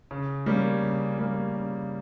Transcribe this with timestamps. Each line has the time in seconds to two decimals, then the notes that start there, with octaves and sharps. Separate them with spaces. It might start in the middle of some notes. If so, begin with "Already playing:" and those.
0.11 C#3
0.46 G3 A#3 C#4
0.82 C#3
1.18 G3 A#3 C#4
1.55 C#3